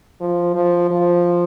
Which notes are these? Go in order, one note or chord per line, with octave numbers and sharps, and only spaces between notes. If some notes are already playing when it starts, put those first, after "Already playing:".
F3
F3
F3